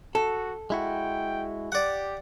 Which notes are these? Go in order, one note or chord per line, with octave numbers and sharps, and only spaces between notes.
F#4 A4
G#3 E4 F#4 G5
G4 D5 F#5